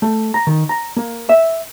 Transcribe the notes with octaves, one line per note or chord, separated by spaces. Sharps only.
A3
A#5
D#3
A#5
A#3
E5